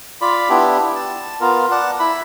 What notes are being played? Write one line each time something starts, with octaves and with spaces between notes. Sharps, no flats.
F4 D5 B5
B3 D4 E4 G4
A5
B3 F4 A#4
D5 F#5 A5
E4 B5